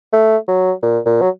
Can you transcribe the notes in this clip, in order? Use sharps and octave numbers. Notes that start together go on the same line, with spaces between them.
A3
F#3
A#2
A#2
F#3